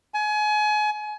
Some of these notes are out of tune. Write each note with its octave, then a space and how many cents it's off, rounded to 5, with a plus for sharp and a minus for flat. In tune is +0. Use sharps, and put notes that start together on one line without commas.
G#5 +30